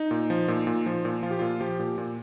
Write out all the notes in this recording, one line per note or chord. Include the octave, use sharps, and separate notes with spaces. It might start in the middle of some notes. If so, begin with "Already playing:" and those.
Already playing: D#4
A#2
F3
A#2
A#2
F3
A#2
F3 F4
G4
A#2 F4
F3 G4
A#2
A#2